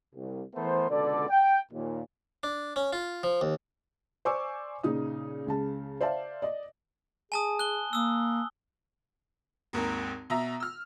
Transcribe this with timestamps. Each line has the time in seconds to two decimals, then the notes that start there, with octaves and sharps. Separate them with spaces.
0.15 C2
0.55 E3 A3 B3 A#4 C5
0.90 C#2 B2 D3 A4 D5
1.29 G5
1.72 D#2 A#2
2.43 D4
2.76 C#4
2.93 F4
3.23 F3
3.41 D#2
4.25 C5 D5 G#5 C#6 D6 E6
4.83 A#2 C#3 D#4 D#6
5.46 C#2 C#3 A5
6.01 C5 D5 E5 F5 A5
6.42 D5 D#5
7.32 G#4 G#5 A5 D#6
7.59 F#6 G7
7.93 A#3 D#6 E6
9.73 G#1 D#2 A#4
10.30 B2 E5 A#5
10.60 E6 F6